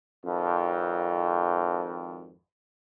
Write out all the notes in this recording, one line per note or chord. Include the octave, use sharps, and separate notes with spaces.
G#1 F2